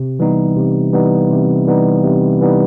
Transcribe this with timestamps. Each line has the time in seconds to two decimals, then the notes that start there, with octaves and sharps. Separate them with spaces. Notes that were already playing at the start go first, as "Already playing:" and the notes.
Already playing: C3
0.19 E3 G3 B3 D#4
0.57 C3
0.93 E3 G3 B3 D#4
1.31 C3
1.67 E3 G3 B3 D#4
2.04 C3
2.41 E3 G3 B3 D#4